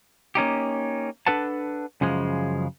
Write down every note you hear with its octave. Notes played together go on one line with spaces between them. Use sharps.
A#3 C#4 D#4 G4
D4 A4 B4 F#5 A5
F#2 C#3 F3 G#3